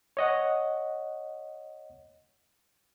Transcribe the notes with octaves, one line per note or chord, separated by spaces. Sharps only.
C#5 D#5 F#5